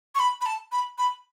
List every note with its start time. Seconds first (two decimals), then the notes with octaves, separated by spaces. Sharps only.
0.15 C#6
0.19 B5
0.41 B5
0.46 A5
0.72 B5
0.98 B5